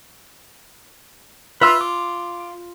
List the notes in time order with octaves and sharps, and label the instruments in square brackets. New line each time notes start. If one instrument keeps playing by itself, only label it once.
[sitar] F4 [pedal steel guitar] B4 E5 E6
[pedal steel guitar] D6